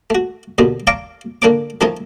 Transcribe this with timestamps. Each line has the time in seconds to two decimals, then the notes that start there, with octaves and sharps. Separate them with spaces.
0.10 A3 F#4
0.58 D#2 B2 D3 B3
0.87 C#5 D5 F5 A5 A#5 D6
1.42 D3 A#3 D4 C#5 D6
1.81 D#3 F3 A3 D#4 E4 C#5